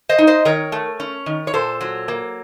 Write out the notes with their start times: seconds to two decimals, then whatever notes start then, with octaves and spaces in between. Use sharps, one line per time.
0.09 C5 D#5
0.18 D#4
0.27 C5 D#5
0.45 D#3 A#4 C#5
0.72 A3
1.00 C#4
1.26 D#3
1.47 C#5
1.54 A#2 A4 C5
1.81 F#3
2.08 A#3